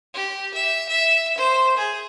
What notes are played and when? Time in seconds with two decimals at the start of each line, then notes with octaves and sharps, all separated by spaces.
0.14 G4
0.54 E5
0.89 E5
1.38 C5
1.77 G#4